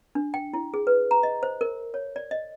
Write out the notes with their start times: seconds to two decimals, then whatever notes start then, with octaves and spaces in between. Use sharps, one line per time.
0.15 D4
0.34 G5
0.53 E4
0.74 G#4
0.87 B4
1.11 A#5
1.23 D#5
1.43 C5
1.61 A#4
1.94 C#5
2.16 D5
2.31 D#5